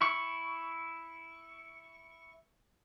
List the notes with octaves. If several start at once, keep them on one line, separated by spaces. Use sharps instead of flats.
E4 C#6